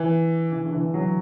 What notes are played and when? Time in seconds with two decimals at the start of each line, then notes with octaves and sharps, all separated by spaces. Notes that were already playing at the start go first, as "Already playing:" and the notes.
Already playing: E3
0.52 E3
0.65 D3
0.72 E3
0.94 F#3